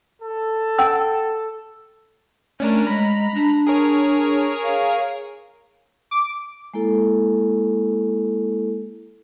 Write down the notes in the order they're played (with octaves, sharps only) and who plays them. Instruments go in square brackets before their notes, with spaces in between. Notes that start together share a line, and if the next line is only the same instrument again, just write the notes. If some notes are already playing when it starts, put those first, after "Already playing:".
[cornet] A4
[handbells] F#5 G5 E6
[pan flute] A3 [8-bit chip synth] C#4 D4 A#4
[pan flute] G#3 [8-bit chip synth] A#5 B5
[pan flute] D4
[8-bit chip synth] G#4 A#4 C#5
[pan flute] F5
[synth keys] D6
[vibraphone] G#3 A#3 E4 A4